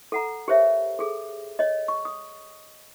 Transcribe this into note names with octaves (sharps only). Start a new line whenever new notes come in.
A4 F#5 A#5
G4 A#4 C5 C#5 E5
G#4 A4
C#5 D#5
C#6
D#6